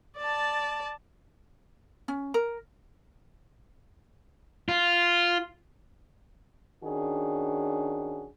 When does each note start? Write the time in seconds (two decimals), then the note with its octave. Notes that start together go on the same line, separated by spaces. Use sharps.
0.18 D5 A5
2.08 C#4
2.34 A#4
4.69 F4
6.84 D#3 C#4 D4 F#4 G#4